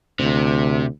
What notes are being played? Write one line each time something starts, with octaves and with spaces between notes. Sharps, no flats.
D2 C3